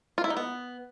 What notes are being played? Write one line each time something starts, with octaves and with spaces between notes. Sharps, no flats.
F4
E4
D#4
B3